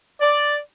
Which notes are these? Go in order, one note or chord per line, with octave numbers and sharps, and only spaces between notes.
D5